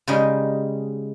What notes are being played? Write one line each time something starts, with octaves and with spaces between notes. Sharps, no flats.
C#3 G3 G#3 D#4 D#5